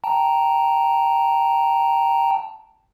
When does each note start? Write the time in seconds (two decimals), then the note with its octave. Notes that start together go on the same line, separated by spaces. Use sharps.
0.04 G5 A5 A#5